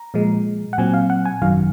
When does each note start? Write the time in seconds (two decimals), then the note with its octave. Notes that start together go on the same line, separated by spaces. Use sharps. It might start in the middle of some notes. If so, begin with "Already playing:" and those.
Already playing: A#5
0.14 A#2 F3 G#3
0.73 F#5
0.78 A#2 F#3 C4 G#5
0.94 F5
1.10 F#5
1.25 G#5
1.42 G#1 F#2 D#3 F#3 F5